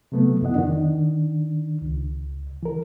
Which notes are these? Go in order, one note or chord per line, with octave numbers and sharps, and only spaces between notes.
C3 F#3 A3 B3
F2 B3 E4 D#5 F#5
D#3 D4
C#2
E3 A#4